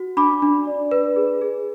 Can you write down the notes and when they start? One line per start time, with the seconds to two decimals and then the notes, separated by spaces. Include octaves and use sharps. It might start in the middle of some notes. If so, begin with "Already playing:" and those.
Already playing: F#4
0.17 D4 B5 D6
0.42 D4
0.67 D5
0.91 B4
1.16 G#4
1.41 G#4